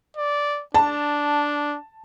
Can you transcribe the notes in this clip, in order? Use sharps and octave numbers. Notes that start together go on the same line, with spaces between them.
D5
D4 A5